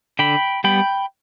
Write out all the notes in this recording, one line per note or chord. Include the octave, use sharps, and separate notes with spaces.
D3 G5 B5
G3 B3 G5 B5